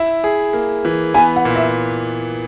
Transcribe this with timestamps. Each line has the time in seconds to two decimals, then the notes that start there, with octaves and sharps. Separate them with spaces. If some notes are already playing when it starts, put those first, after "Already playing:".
Already playing: E4 E5
0.24 G#4
0.53 A#3
0.85 E3
1.14 B3 G#5
1.36 F#5
1.45 A#2
1.56 E5